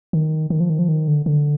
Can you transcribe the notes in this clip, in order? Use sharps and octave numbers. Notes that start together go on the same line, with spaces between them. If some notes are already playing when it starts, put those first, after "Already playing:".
D#3
D#3
F3
D#3
F3
D#3
D3
D3